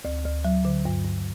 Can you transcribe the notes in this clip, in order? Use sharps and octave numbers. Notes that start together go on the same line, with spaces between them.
D2
D2
F#3
D3
G2
G2